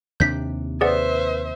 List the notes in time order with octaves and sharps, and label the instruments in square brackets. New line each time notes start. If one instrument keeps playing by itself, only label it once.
[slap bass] D#2 C3 D4 [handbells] G6 B6
[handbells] G#4 D5 F#5 [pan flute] B4 [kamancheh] C5 E5